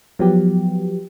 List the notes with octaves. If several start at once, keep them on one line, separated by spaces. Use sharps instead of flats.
F3 F#3 B3 G4